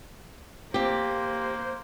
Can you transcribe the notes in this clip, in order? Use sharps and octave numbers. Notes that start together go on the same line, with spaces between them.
A#3 C4 G4 C5